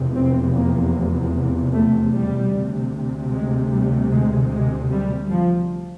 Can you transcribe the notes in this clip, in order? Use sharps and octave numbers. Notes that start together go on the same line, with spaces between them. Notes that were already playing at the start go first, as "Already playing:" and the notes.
Already playing: F1 E2 C3
C4
A#3
A3
G3
D2 C3
G#3
G3
G#3
G#3
G3
F3